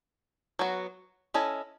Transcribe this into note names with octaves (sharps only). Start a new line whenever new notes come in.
F#3 B3 F#4
C#4 E4 A4 D#5